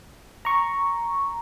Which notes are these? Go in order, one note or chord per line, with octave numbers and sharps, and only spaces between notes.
A#5 C#6